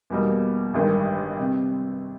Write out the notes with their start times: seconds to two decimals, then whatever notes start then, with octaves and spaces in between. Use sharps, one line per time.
0.10 E2 B2 G3 A#3 D#4
0.74 A1 G2 D#3 G#3
1.39 C3